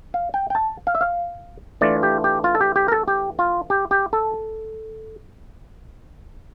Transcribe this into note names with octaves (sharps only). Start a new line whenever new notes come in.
F5
G5
G5
A5
F5
E5
F5
E3 A3 D4 F4 D5
G4
G4
F4
A4
G4
G4
A#4
A4
G4
F4
G4
G4
A4